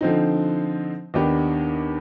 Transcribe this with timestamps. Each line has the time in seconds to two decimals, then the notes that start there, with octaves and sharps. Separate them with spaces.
0.01 D3 F3 C4 D#4
1.14 D#2 D#3 B3 D4 G4